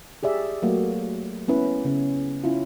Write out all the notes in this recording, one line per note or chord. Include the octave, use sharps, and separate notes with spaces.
G4 G#4 D5 E5
F#3 A3 A#3 F#4
B3 C#4 E4 B4
C#3 C#4
C#4 E4 F4